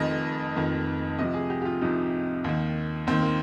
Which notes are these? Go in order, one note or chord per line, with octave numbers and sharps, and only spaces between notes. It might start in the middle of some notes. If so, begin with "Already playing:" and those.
Already playing: F1 F2 D#3 D#5
F1 F2 D#3
C2 C3 F3 D#5
G#4
G4
G4
F4
C2 C3 F3 D#4
D#2 D#3
D#2 D#3 C4
A#3